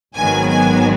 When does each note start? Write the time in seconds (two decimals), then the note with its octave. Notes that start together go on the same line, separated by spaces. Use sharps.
0.17 G#1 G#2 D#3 F#3 B3 G#5
0.50 G#5